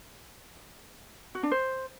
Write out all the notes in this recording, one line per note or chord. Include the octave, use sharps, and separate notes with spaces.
F#4
D4
C5